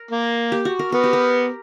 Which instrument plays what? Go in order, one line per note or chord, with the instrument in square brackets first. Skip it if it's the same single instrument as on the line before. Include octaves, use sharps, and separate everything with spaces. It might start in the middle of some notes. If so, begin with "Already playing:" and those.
Already playing: [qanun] A#4
[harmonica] A#3
[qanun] G4
F#4
A#4
[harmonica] B3 [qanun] A#4
[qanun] G4
A#4